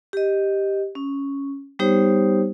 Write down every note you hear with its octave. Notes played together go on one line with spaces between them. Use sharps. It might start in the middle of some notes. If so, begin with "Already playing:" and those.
G4 D#5
C#4
G3 B3 D#4 G4 C5 C#5